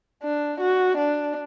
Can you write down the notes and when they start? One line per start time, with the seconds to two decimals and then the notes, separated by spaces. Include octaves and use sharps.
0.23 D4
0.60 F#4
0.97 D4